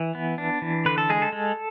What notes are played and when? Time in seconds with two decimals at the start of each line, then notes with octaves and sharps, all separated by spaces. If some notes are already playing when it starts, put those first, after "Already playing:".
Already playing: E3
0.15 B3
0.38 D4
0.62 E3
0.85 D3 B4
0.98 A4
1.10 G#3 G#4
1.22 A4
1.32 G#3